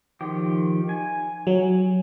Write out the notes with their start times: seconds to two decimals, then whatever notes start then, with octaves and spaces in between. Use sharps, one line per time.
0.21 D#3 F3 G4
0.89 G#5
1.47 F#3